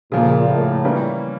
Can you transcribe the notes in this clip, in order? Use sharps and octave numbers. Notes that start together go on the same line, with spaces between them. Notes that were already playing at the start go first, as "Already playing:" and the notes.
A#2 C#3 F3 A#3
A2
E3 G3 A#3 C#4